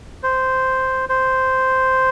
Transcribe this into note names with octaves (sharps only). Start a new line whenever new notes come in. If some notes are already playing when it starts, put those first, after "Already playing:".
C5
C5